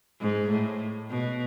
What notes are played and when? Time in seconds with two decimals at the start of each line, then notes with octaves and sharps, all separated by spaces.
0.21 G#2
0.50 A2
1.10 B2